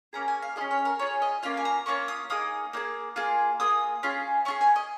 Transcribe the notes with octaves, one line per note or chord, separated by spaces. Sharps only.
A#3 C#4 G#4 A#5
G#5
F5
C#4 F4 G#4 D#5
C#5
A#4
C#4 F4 G#4 C#5
D#5
A#3 C#4 F4 F5
G#5
A#5
A#3 C#4 F4 C#6
D#6
A#3 D#4 G#4 D#6
A#3 D#4 G#4
A#3 F4 G#4
A#3 F4 G#4 D#6
C#4 F4 G#4
C#4 F4 G#4 C#6
G#5
D#5